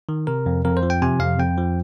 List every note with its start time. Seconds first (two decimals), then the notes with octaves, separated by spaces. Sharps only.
0.09 D#3
0.27 C3 A#4
0.46 F2
0.65 F2 A#4
0.77 C5
0.83 F3
0.90 G5
1.02 C3 G#5
1.20 F2 F5
1.39 F2 G5
1.58 F3